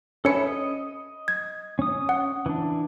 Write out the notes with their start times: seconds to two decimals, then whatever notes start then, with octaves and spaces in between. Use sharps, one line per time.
0.25 C#4 A4 B4 C#5 E5 C#7
0.46 D#5
1.28 G#6
1.79 C#4 D#6
2.09 F#5
2.46 E3 D4